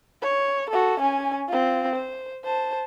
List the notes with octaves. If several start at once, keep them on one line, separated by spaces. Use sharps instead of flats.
C#5
F#4 A4
C#4 G#5
C4 F4
C5
C5 A5